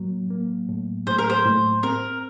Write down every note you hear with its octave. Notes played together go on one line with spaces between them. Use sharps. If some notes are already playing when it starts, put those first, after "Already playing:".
Already playing: A2 F#3 A#3
A#3
A2
A2 C5
A#4
C5
A2
C4 A#4